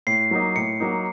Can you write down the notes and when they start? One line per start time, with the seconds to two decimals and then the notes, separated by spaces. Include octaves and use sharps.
0.07 A2 C7
0.31 F#3 A#3 D#4
0.56 A2 C#7
0.80 F#3 A#3 D#4